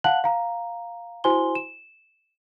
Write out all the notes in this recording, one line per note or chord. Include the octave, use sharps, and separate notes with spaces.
F5 F#5 A5 F#6 F#7
F5 A#5
E4 F#4 C5 G#5 C6 G7
E7